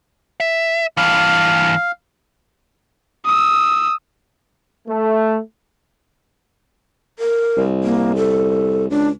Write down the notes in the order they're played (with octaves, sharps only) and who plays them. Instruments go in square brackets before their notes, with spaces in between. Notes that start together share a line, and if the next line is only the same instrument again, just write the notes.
[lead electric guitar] E5
[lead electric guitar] G2 E3 [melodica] F5
[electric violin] D#6 E6
[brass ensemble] A3
[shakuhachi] A#4
[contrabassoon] C2
[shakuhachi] A#3
A4
[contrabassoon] C#2 [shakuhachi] D4